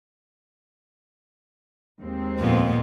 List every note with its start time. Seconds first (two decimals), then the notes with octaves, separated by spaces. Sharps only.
2.00 D#2 G#3 C4
2.39 F2 A#2 B3